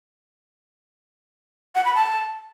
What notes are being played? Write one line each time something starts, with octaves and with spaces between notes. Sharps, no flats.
F#5
B5
A5